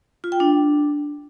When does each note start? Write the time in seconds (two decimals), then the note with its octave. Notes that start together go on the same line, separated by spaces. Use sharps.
0.24 F4
0.32 G5
0.40 D4